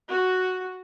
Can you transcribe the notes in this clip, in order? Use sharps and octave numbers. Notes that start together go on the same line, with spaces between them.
F#4